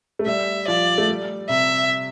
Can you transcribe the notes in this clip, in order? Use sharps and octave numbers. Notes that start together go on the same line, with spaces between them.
A3
G3 E5
F3 D5
A3
G3
C3 E5